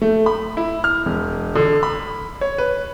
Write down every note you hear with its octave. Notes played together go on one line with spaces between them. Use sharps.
A3
B5
E4
F6
E1
D3
B5
C#5
B4